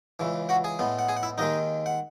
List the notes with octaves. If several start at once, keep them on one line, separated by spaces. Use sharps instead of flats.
C#2 C#3 E3
F#4 F#5
G#4 G#5
A2 G#3 B3
F#5
G#4 G#5
F#5
E4 E5
D#2 D#3 G#3 D#4 D#5
F#5